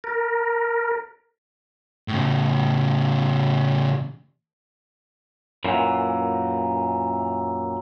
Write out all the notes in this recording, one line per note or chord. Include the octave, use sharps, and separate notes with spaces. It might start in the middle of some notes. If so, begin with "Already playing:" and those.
A#4
A2 C#3
F#2 A#2 E3